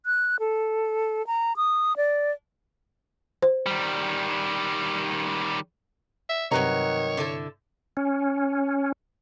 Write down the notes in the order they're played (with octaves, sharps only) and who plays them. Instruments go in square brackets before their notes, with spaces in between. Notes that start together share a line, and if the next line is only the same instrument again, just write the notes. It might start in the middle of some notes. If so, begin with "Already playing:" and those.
[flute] F#6
A4
A#5
D#6
D5
[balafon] C5
[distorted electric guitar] D#3 G3
[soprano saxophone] E5
[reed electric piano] G2 C3 [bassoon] D#3 [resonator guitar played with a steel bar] F#3 B4 A#5 [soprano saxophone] C#5
[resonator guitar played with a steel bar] D3 E4 A4
[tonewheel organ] C#4